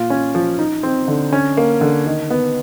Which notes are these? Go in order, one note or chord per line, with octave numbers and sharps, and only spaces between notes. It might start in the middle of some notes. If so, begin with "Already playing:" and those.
Already playing: A#2 F4
C#4
F3
D#4
C4
D3
C#4
A#3
D3
D#3
B3